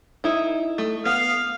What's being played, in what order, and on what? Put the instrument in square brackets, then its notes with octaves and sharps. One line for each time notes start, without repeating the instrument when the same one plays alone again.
[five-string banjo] D#4 E4
A3
[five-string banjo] B3 [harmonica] F5